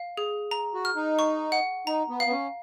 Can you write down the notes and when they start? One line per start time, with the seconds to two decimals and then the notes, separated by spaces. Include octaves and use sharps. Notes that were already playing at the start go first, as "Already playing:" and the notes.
Already playing: F5
0.17 G#4
0.51 A#5
0.74 F#4
0.85 F6
0.96 D#4
1.19 C#6
1.52 F#5
1.87 D#4 A#5
2.09 B3
2.20 F5
2.26 B3
2.31 C#4